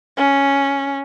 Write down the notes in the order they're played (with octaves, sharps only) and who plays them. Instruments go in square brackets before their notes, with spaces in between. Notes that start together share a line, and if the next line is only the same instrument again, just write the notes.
[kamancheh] C#4